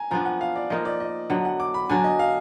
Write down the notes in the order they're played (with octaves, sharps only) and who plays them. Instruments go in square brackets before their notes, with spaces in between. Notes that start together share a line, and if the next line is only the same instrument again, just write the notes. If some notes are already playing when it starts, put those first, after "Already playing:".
Already playing: [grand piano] G#5 A#5
[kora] F3 B3 D4 [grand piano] A#5
[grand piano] F#5
F5
D5
[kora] F3 A#3 D#4 [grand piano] D#5
[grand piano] D5
D#5
[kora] D3 F#3 B3 [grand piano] F#5
[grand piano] F#5
D6
B5
[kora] D3 F#3 D4 [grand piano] G#5
[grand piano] D#5
F5